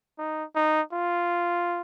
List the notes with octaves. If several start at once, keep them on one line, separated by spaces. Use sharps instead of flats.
D#4
D#4
F4